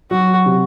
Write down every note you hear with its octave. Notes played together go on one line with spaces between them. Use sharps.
F#3 F#4
C3